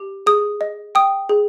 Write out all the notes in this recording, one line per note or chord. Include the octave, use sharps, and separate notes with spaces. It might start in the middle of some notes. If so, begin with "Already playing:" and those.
Already playing: G4
G#4 D#6
D#5
G5 D#6
G#4